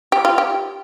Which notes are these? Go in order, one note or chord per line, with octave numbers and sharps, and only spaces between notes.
G4
F4
G4